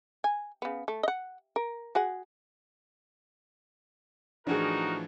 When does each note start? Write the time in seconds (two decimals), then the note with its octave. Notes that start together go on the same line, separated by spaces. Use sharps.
0.24 G#5
0.62 C#3 B3
0.88 A3
1.03 D#5 F#5
1.56 A#4
1.95 F#4 G#4 F#5
4.47 A2 E3 F3 D4 D#4 F#4 G#4 A#4